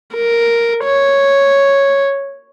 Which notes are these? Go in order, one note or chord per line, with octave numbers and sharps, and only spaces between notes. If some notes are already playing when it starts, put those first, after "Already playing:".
A#4
C#5